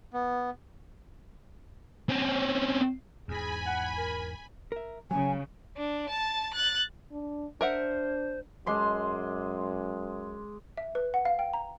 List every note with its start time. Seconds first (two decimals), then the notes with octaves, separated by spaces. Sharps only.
0.14 B3
2.09 C4 C#4
3.28 E2 G#2 G#4 G#5 B5
3.66 F#5
3.98 A#4
4.72 A#4 E5
5.11 C#3 F#3 G#5
5.77 D4
6.10 A5 A6
6.54 F#6 A6
7.11 D4
7.61 D4 A#4 C5 E5 F#5
8.66 F#2 G#3 C6 D6
10.77 E5
10.95 B4
11.14 F#5
11.25 F5
11.39 G5
11.53 A#5